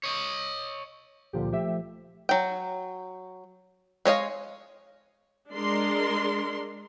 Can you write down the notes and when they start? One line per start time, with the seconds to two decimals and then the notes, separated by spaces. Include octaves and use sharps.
0.03 C#5 D#5
1.33 C#2 A#2 D3 F3 G4
1.52 F3 A3 G4 E5
2.29 F#3 G5
4.05 G#3 C#5 D#5 F5
5.52 G#3 D4 A#4 C6